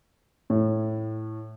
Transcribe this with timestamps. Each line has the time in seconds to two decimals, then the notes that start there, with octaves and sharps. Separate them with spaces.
0.50 A2